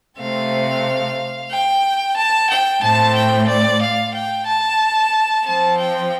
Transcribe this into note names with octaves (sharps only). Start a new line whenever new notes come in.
C3 A3 C4 F5
G5
A5
G5
A2 A3 C4 A5
G5
D5
F5
G5
A5
F3 C4 A5
G5